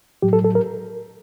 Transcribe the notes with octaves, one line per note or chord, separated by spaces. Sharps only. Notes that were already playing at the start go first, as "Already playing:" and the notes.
A2 F#3 G4
A4
A4
A#4